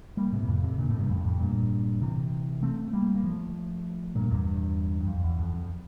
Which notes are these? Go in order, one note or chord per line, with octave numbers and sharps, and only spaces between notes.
G3 A#3
A2 C3
A#2
F2 A2
A2 C3
A#2 D3
A2 C3
G2 A#2
F2 A2
F2 A2
G2 A#2
C3 E3
A3 C4
A3
G3 A#3
A#3
F3 A3
G2 A#2
E2 G2
G2
F2
E2
F2
F2